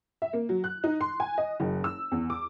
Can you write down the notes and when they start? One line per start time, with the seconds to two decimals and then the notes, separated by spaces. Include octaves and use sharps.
0.22 E5
0.33 A#3
0.49 F#3
0.64 F#6
0.84 D#4
1.01 C6
1.20 G#5
1.38 D#5
1.60 F#1
1.84 E6
2.12 E2
2.30 D6